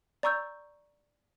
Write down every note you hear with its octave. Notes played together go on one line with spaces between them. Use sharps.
D5 A#5 C#6 E6 G6